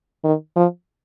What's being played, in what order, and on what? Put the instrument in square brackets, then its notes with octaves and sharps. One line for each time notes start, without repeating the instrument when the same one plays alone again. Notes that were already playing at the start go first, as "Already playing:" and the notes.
[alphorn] D#3
F3